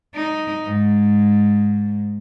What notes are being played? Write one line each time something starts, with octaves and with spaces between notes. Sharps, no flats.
D#4
G#2